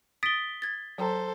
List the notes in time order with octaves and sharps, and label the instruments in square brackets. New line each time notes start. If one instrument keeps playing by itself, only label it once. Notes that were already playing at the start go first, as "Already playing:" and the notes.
[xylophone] D#6 A6 D7 [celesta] B6 G7
[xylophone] G#6 A6
[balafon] F#3 G5 A#5 [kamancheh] A4 C5